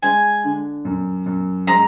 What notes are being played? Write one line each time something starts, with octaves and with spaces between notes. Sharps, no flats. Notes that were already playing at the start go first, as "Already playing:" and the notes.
G#3 G#5
D3
F#2
F#2
G#3 A#5